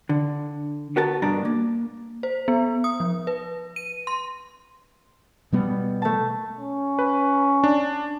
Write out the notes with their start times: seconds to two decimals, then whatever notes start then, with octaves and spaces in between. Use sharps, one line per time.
0.09 D3
0.96 B3 F#4 A#4 A5
1.22 G2 B2 D4 A#5
1.45 A#3
2.23 C5
2.48 B3
2.84 D#6
3.00 F3
3.27 B4
3.76 D#7
4.07 C6
5.52 B2 G3 B3
6.02 A3 A5
6.58 C#4
6.99 B4
7.64 D4